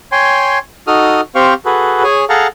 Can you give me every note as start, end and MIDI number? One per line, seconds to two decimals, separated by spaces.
0.12 0.59 73
0.12 0.59 79
0.12 0.59 80
0.12 0.59 84
0.87 1.21 63
0.87 1.21 66
0.87 1.21 69
0.87 1.21 87
0.87 1.21 89
1.35 1.54 60
1.35 1.54 67
1.35 1.54 72
1.35 1.54 77
1.35 1.54 79
1.35 1.54 85
1.65 2.03 66
1.65 2.03 68
1.65 2.03 69
1.65 2.03 71
2.03 2.25 68
2.03 2.25 73
2.03 2.25 80
2.29 2.47 68
2.29 2.47 69
2.29 2.47 77
2.29 2.47 78
2.29 2.47 81
2.29 2.47 82